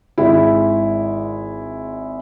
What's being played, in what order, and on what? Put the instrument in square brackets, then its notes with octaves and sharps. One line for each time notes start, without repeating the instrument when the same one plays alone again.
[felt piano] G#1 G#3 E4